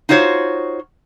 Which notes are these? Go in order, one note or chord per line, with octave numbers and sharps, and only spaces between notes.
D#4 F4 F#4 C5 C#5